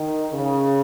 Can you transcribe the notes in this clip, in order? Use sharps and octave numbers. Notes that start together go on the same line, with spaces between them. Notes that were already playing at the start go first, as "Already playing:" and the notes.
Already playing: D#3
C#3